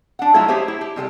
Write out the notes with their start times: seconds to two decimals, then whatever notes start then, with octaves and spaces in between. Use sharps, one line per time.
0.19 D4 F#5
0.34 F#3 G#3 A3 E4 F4 A4
0.48 G4 G#4 C5 C#5 E5
0.68 E4
0.81 G4
0.96 C3 G3 G#4 A4